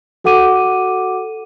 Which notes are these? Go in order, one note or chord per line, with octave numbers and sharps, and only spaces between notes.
F#4 A4 F#5 D6 D#7